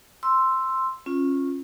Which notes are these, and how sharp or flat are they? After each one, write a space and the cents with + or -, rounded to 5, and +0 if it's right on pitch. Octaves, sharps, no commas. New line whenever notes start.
C6 +0 E6 +5
C#4 -20 F4 +0